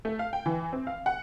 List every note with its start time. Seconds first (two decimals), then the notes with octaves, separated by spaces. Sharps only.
0.05 A3
0.19 F5
0.33 G5
0.46 E3
0.73 C4
0.87 F5
1.06 F#5